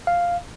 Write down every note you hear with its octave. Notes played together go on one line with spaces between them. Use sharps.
F5